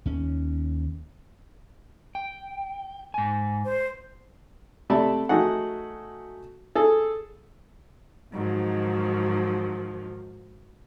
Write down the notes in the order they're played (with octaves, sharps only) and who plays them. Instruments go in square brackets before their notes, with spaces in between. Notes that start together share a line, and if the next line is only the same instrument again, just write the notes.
[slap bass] D#2 C#4
[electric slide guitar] G5
G#2 G#5
[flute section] C5
[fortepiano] C3 A3 D5 E5 A5 B5
A3 D#4 F#4 G#4 F#5
G#4 A4
[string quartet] G#2 D#3 F3 F#3